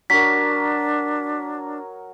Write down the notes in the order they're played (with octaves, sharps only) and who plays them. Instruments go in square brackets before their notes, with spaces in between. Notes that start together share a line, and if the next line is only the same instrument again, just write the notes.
[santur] F#3 A#4 [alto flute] D4 [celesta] B6